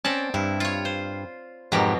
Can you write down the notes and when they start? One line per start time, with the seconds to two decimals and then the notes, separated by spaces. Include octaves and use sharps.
0.05 C4 C#4 D5 A5
0.34 G2 E4
0.60 F4 C#5
0.85 C5
1.72 F2 G#2 B2 F#3 G4 A#4